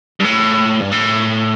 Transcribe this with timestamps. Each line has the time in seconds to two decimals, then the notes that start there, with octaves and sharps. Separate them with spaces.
0.20 G2
0.25 A2
0.81 G2
0.92 A2